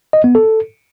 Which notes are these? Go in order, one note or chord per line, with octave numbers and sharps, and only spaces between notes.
D#5
B3
A4